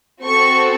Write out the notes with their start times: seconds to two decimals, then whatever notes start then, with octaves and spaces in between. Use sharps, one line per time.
0.24 C4 F#4 A4 C#6